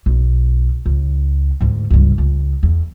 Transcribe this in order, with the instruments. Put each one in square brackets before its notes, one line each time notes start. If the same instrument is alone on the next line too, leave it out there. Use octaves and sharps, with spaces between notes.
[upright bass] B1
C#2
D2 G#2
C#2 G2
C#2
E2